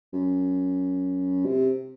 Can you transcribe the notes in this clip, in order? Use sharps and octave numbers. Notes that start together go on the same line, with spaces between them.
F#2
C3